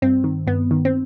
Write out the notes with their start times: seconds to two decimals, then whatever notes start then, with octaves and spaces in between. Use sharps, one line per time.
0.02 G2 C4
0.24 D#3
0.47 G2 B3
0.71 D#3
0.85 C4